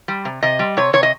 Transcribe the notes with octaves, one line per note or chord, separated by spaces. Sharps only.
G3
C3
C3 D#5
G3
C3 C#5
C3 C#5
D#5